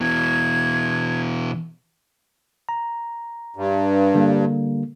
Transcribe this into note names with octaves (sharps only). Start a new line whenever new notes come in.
B2 E3 G#6
A#5
G2
D3 G3 A#3